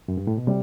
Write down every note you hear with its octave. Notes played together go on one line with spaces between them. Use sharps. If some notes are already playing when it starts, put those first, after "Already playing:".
F#2
G2
A2
B2
C3 G3